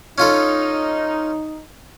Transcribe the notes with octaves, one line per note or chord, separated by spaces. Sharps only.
C#4 D#4 F4 A4